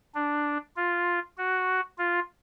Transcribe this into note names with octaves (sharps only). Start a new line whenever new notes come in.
D4
F4
F#4
F4